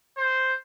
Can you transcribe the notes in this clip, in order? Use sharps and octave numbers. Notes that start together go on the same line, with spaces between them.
C5